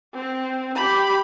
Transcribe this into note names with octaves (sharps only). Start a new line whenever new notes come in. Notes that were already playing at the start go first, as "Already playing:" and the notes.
C4
G4 B5